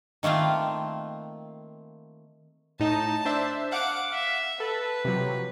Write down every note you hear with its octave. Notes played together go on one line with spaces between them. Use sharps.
D#3 A3 A#3 C4 F4
A2 D#4 A5
D4 C5 E5
F5 F#5 D6
E5
A4 B4
C3 F3 F#3